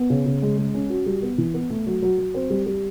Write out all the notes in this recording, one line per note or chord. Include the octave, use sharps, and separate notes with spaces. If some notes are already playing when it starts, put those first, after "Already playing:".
Already playing: B3
C#3
C#3
G#3
G#3
C#4
F#4
G3
B3
E3
B3
A3
F#3
F#3
F#3
C4
G3
G3